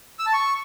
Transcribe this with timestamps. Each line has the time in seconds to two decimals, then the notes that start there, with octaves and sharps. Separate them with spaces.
0.19 E6
0.26 A5
0.33 C#6